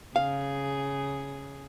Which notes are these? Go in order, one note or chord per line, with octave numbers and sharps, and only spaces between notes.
C#3 G#4 F5